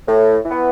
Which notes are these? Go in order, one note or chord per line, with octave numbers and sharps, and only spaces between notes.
A2
E3
B3